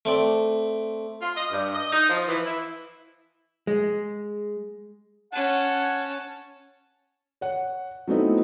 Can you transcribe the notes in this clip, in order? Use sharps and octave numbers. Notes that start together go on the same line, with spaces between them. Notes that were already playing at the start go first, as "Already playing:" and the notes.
A3 C4 D5
F4
D#5
G2
D#5
D#4
F3
E3
E4
G#3
C#4 F#5 A5
C#5 F#5
F#3 A3 B3 C4 D#4 E4